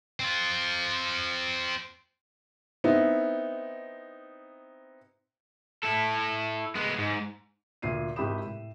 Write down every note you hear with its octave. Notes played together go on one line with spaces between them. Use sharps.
C4 F4
B3 C4 D#4 E4
E4 A4
G#3 B3
G#2
D2 A#2 C7 D#7
G#1 E4 G4 B5 D#6 E7
A2